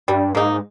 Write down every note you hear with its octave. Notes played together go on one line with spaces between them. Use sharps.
G2 G3
G#2 A#3 D#4